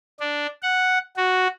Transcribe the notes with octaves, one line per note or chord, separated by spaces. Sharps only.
D4
F#5
F#4